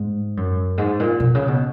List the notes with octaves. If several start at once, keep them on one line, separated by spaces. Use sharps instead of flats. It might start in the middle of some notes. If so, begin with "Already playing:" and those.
Already playing: G#2
F#2
G#2
A#2
B2
C#3
B2